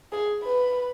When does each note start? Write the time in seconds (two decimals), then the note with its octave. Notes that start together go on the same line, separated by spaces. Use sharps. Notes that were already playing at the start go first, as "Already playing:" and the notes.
0.12 G#4
0.44 B4